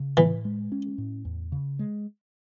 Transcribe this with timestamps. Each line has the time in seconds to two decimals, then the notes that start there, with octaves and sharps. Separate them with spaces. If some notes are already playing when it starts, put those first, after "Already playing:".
Already playing: C#3
0.17 A2 E3
0.45 G#3
0.72 C#4
0.98 A2
1.25 E2
1.52 C#3
1.79 G#3